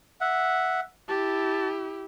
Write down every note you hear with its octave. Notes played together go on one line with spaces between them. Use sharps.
E5 F#5
E4 G4 A5